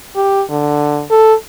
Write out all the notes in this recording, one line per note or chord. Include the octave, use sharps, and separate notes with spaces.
G4
D3
A4